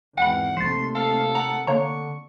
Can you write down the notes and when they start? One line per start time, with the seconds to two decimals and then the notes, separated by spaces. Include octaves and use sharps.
0.18 G#1 E2 F#5 G5 B5
0.57 A#1 D#2 C3 A3 C6 A6
0.95 A4 F5
1.35 F#5 A#5
1.67 D3 A#3 C#5 A#5 C#6